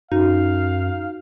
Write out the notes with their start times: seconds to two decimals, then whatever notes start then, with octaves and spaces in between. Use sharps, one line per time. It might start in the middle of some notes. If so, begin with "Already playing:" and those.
0.12 F#2 D#4 F#4 F5